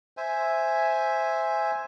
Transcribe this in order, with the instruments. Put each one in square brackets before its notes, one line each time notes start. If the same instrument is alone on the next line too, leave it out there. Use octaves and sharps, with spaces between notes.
[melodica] C5 E5 G#5